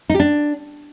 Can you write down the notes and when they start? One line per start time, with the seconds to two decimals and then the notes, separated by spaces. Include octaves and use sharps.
0.10 D#4
0.15 G4
0.20 D4